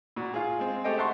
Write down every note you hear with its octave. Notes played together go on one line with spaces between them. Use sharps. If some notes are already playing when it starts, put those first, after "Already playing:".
A#2 F#4
F4 G#4
G#3 C4
A3 G4 A4 C5 D#5 G5
E5 F#5 A5 C6 C#6